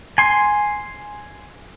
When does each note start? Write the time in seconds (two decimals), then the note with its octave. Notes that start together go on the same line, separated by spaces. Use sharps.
0.18 G#5 C6